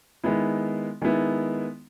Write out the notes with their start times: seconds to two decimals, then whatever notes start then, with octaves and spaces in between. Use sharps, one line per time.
0.24 D#3 G#3 B3 E4
1.02 D#3 G#3 B3 E4